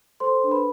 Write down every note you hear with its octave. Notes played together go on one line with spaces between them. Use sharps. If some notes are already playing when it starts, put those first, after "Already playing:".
A4 C5 C6
D4
B4 B5